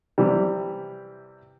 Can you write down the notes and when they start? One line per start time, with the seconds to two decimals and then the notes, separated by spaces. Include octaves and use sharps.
0.18 C3 E3 G3